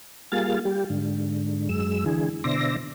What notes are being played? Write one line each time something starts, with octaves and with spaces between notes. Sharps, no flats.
G3 A#3 F4 G#4 F5 A6
G3 G4
G#2 D3
F#2 G#3 E6
D3 E3 G#4
B2 D3 C5 D5 E5 A#6